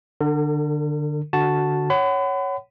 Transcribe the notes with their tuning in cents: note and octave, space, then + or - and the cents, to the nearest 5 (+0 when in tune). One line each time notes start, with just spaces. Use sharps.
D3 +20 A#4 -45
D3 +0 F#4 +0 A5 +0
C#5 +0 F#5 +25 B5 +40